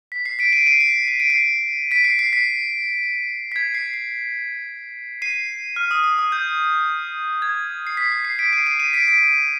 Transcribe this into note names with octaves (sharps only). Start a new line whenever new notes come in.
B6
C7
B6 D7
C7 D#7
D7
C7 D#7
C7
C7
D7
C7
B6 D7
C7
C7
B6
B6
G#6
C7
C7
C7 D#7
F6
D#6
D#6
D#6
G6
G#6
C7
B6
C7
C7
B6 D7
C7 D#7
C7 D#7
C7 D#7
B6 D7
B6 D7